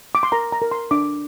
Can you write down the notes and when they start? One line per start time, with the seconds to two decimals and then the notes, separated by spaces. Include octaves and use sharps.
0.15 D6
0.23 C6
0.32 A#4 A#5
0.52 A#5
0.62 A#4
0.71 C6
0.91 D4 D6